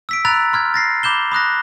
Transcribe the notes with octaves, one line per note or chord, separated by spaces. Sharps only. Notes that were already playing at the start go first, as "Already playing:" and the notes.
E6 B6 D7
A#5 B5 E6 F#6 A6 F7
C6 F6 G#6
A6 A#6 C7
B5 D6 G6 E7 G7
B5 D#6 F#6 A#6